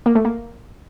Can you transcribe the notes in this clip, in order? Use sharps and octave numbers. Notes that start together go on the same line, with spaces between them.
A#3
A3
A#3